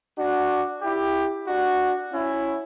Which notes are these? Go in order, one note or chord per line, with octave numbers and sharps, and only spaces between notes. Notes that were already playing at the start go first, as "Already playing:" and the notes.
D4 F#4
E4 G4
D4 F#4
C#4 E4